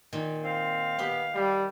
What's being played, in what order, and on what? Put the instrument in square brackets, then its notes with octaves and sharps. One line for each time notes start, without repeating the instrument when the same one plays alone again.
[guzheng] A#2 D#3
[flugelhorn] C4 [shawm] F5
[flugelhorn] B3 [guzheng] G4 B5
[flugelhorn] G3